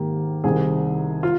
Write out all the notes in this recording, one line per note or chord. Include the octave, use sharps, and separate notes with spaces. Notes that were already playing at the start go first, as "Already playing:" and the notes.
Already playing: G#2 D#3 A#3 G4
C2 C3 D#3 G#4
F4